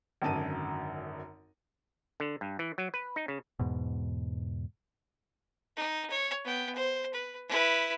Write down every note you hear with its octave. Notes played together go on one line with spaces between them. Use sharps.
G#1 F#2 D3 A5 A#5 D#7
D3
G2
E3
F#3
B4
D#4
C#3
E2 G#2 B2
D#4
C#5
B3 G5
C5
B4
E4 B4